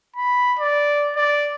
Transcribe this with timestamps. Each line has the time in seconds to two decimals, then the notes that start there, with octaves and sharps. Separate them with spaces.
0.16 B5
0.59 D5
1.16 D5